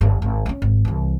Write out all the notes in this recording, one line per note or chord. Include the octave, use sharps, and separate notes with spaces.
G1 G2
G#1
A#3 C#4
G#1
C2 E3